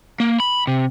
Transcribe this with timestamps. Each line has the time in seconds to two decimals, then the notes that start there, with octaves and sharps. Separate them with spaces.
0.20 A#3
0.40 B5
0.67 C3